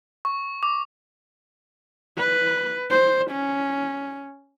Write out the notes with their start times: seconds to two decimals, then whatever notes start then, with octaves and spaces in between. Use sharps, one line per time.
0.25 C#6
0.63 D6
2.18 B4
2.90 C5
3.31 C#4